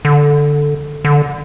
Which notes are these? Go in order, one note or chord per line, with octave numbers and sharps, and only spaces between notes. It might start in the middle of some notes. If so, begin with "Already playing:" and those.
D3
D3